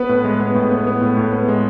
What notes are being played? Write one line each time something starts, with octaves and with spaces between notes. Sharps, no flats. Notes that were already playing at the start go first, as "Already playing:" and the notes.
Already playing: B3 B4
A2
G#3
B3
A2
B3
B3
A2
A2
B3
G#3